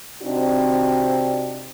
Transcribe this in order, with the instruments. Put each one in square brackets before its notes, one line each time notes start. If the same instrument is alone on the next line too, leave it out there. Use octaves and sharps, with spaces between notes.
[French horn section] C3 C4 D4 D#4 F#4